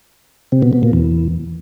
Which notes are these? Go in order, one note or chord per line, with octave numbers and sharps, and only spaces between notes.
C3
B2
B2
A#2
E2